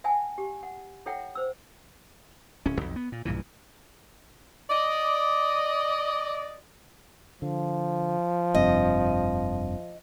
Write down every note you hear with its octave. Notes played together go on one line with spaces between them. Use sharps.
E5 F#5 G#5 A5
G4
F#5
E4 A4 C#5 E5 F#5 G5
C5 E6
D1 C#4
B1 F2
B3
A#2
B1 G2 A#2 E3
D5 D#5
D3 F3
F1 G2 C4 D#5